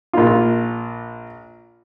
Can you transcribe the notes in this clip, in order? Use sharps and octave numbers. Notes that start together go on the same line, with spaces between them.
A#1 A#3 F4